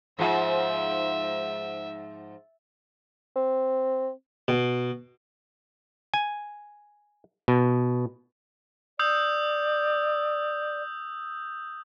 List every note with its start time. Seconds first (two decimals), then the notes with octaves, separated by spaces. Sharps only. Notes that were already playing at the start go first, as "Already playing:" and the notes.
0.19 G#2 F3 F4 E5
3.36 C4
4.48 B2
6.14 G#5
7.48 B2
8.99 D5 D#6 E6 G6